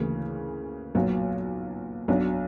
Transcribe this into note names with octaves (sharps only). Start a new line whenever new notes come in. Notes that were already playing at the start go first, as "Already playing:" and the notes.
Already playing: D2 C#3 E3 A#3
B1 A#2 F#3 B3
B1 B2 F#3 D4